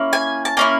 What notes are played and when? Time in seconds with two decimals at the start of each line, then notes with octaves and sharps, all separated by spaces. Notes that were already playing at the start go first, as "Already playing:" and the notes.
Already playing: A#3 C#4 E4
0.13 G#5
0.45 A5
0.57 A#3 C#4 E4 G#5